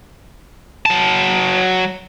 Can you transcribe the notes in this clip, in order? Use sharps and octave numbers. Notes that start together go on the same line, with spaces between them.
F#3 A5